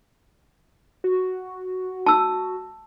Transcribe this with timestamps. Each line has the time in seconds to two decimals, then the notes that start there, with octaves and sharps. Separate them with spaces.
1.04 F#4
2.06 A5 E6